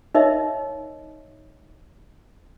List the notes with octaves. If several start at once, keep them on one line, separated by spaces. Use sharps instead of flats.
D#4 A#4 C#5 D#5 E5